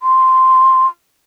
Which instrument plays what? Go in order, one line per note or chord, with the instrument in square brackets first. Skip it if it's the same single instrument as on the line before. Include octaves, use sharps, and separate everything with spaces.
[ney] C6